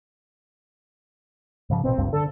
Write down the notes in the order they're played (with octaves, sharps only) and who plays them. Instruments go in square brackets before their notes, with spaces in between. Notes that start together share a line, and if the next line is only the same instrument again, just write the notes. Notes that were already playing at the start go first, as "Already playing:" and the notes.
[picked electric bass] G#2 C#3 F3
[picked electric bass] A1 B2 [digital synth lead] C4
[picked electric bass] G1 C#2 G2
[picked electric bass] D3 [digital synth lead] A4